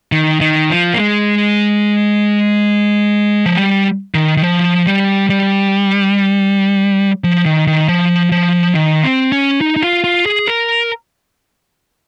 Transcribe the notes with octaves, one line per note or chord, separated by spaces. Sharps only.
D#3
D#3
F3
A#3
G#3
F3
G3
D#3
D#3
F3
G3
G3
F3
D#3
D#3
F3
F3
D#3
C4
C#4
D#4
D#4
F4
F4
G#4
A#4